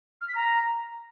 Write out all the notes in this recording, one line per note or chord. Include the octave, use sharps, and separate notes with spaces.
F6
B6
A#5